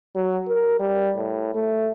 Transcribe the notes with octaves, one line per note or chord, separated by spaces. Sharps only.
F#3
A#4
G3
A2
A3